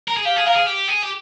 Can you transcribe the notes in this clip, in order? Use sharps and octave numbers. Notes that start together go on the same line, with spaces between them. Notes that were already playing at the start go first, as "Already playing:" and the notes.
A#4
G#4
G4 F5
G#4
A#4 F5
G#4
G4
G#4
G4